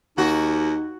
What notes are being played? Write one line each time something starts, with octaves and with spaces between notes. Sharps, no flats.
D#2 D#4 F#4